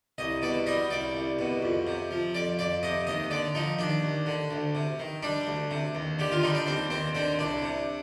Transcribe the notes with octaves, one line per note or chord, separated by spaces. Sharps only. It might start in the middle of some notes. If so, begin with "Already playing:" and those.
C2 D#5
B2 D5
G3 D#5
C2 D5
C2
B2
F2
C3
F3
F2 D5
F2 D5
C3 D#5
D#2 D#5
D3 D5
F3 D#4
D#2 D4
D#2
D3
D2
C3
D#3
G3 D4
D2
C3
D#2
D3 G4
F4
G3 D#4
D4
D#2 C4
D#2 C4
D3 C4
C2 D4
C3